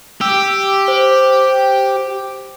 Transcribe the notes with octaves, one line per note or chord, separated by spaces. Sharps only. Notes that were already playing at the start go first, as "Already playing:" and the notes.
G4 E6
C5